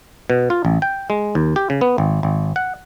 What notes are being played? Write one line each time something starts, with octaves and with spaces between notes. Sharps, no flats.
B2
F4
A1
G5
G#3
D#2
G4
C#3
B3
G#1
G#1
F#5